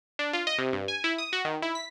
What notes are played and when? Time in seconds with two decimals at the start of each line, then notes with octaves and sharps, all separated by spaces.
0.19 D4
0.33 F4
0.47 D#5
0.58 C3
0.73 G2
0.88 G#5
1.04 E4
1.18 D#6
1.33 F#4
1.45 D#3
1.62 E4
1.75 B6